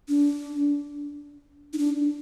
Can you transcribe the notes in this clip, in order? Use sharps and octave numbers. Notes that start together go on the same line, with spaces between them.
D4
D#4
D4